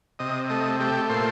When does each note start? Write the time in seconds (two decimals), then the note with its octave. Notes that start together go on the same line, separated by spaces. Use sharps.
0.19 C3 D#5
0.49 A3 D#5
0.80 A3 G4
1.09 A#2 C5